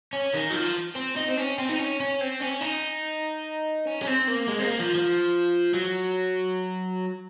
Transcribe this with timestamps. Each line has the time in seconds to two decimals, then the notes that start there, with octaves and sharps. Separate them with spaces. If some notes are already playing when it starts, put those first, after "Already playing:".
0.13 C#4
0.34 D#3
0.51 F#3
0.54 F3
0.96 C4
1.17 D#4
1.29 C4
1.38 C#4
1.58 C4
1.69 D#4
1.79 C#4
2.00 C#4
2.21 C4
2.41 C#4
2.62 D#4
3.87 C#4
4.02 C#4
4.07 C4
4.28 A#3
4.49 G#3
4.60 C4
4.64 A#3
4.80 F3
4.95 F3
5.74 F#3